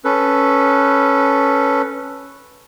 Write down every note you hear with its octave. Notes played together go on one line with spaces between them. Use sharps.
C#4 A4 B4